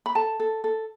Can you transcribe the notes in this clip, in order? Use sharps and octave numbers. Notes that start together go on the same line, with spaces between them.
B5
A4 A5
A4
A4